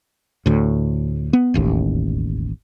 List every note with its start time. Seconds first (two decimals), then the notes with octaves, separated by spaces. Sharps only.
0.46 D2 A2
1.33 B3
1.54 E1 A1 D#2